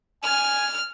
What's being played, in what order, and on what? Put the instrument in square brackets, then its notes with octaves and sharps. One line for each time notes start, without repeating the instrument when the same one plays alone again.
[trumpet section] G#5 [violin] F6